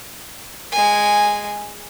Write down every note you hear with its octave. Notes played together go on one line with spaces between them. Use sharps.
G#3 G#5